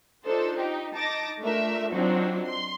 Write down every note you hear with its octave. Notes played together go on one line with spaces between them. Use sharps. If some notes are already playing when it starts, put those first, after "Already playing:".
D4 D#4 F4 A4 C5
D#4 G4
D#4 A5 D6 A6 A#6
A3 D4 F4 A#4 E5
F#3 C4 D4 D#4 F4 F#4
C6